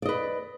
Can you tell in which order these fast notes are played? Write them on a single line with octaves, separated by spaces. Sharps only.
D5 D#5 B4